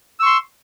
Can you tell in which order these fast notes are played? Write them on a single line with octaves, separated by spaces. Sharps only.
E6 C#6 C6